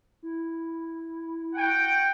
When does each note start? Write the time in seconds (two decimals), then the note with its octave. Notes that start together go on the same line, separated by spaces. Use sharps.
0.23 E4
1.55 F#4 F#5 G5